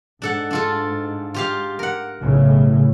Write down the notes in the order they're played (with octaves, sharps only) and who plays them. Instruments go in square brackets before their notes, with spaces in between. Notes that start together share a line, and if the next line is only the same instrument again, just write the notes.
[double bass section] G#2 [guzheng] D4 A4 F#5
[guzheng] D4 F4 A4
F4 G4 F5
A#4 F#5
[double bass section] B1 A2 C#3